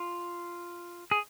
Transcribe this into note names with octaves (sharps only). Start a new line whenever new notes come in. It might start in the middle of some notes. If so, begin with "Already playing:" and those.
Already playing: F4
G#4